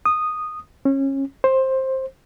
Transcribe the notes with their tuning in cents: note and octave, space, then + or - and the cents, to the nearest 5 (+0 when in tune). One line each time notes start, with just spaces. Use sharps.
D#6 -10
C#4 -25
C5 +15